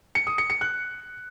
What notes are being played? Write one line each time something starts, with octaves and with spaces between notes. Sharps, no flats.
C#7
D#6
C#7
C#7
F#6